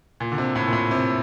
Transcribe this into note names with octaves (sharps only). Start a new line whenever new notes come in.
A#2
D3
C3
A2
A#2
A2
C3